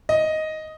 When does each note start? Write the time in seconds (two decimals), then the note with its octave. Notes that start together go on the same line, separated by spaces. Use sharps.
0.09 D#5